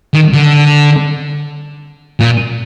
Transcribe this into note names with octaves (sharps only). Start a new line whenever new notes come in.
D#3
D3
A#2